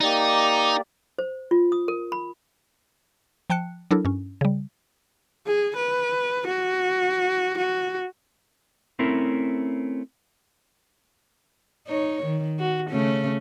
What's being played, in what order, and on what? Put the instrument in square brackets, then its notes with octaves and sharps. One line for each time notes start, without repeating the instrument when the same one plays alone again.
[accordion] A#3 G4 D5 [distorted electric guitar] D#4
[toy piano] C5
F4
D#6
A#4
B5
[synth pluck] F3 G5 A5 F#6 C#7
F#3 D4 E4 A4 A#4
G2 C#4
C#3 G3
[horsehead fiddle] G#4
B4
F#4
F#4
[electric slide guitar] A3 C4 C#4 E4 A#4
[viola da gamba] D#4 C#5
D#3
F#4
C#3 A3 C#4